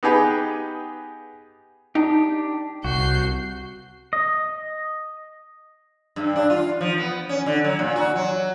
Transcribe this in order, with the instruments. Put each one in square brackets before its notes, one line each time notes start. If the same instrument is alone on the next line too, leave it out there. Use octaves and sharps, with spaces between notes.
[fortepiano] B3 D#4 G4 G#4 B4
[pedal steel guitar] D4 G4 [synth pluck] D#4
[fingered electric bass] C2 [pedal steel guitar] F#4 [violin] G6 C7
[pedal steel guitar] D#5
[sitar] G2
D4
F4
F3
B3
C#4
D3
F#3
A#2
F#4
F#3